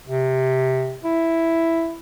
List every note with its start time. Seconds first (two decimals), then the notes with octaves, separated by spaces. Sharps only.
0.07 C3
1.04 E4